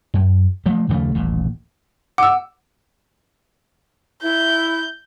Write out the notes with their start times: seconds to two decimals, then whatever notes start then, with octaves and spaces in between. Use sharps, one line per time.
0.14 F#2
0.66 F3 A3 A#3
0.89 D#2 C#3 F3 A3
1.15 D#1 A1 A#2
2.18 F#5 D6 E6
4.23 E4 G6